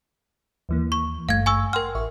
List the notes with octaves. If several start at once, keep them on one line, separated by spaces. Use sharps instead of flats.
D#2 E3 A#3
C#6
G#1 G2 A3 F5 G#6
G#5 C#6 E6
A#4 F#5 G5 C6 F6
A1 E5 C#6